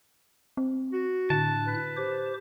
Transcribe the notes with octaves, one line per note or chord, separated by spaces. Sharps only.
C4
F#4
A2 D3 D4 A5 F#6
B4
G4 C5 D6